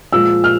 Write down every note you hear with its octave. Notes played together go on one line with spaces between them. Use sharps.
A#2 F3 G#3 E6
F6